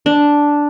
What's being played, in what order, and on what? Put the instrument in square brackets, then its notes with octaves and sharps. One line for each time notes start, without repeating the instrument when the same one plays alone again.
[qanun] D4